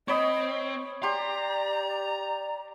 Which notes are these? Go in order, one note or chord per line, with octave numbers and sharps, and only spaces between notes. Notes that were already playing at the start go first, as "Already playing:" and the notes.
C4 C#5 D#5 B5 D#6
G4 D5 A#5 C6